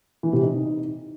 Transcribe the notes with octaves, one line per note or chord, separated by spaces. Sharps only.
E3
C3
D#4